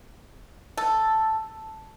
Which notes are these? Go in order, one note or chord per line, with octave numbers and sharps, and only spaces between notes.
A4